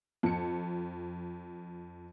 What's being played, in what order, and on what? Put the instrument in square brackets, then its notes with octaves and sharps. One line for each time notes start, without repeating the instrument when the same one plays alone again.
[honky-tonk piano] F2 C#7